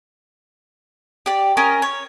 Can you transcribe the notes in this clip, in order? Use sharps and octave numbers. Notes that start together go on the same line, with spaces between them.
G4 D5
C#4 A#4 D#5
C#5